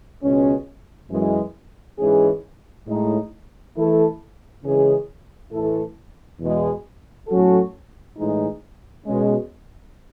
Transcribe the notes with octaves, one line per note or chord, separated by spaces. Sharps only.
C#2 B2 G#3 C#4
F#2 E3 G#3
G#2 E3 G#3 C#4 G#4
A2 G#3 D#4
E3 A3 E4 A4
C#3 E3 G#3 C#4 G#4
A2 E3 A3 E4 A4
E2 B2 G#3
A2 F#3 C#4 F#4 A4
A2 E3 G#3 D#4
B2 G#3 C#4